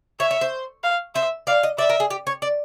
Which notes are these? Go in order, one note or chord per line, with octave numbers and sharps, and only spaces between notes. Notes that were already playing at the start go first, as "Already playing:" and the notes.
C#5 E5
C#5
C5
F5
C5 E5
D5 F5
D#5
D5 E5
A#4
G#4
G4
C#5
D5